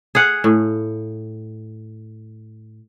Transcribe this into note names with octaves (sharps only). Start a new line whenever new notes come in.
G#4 F5 F#5
A2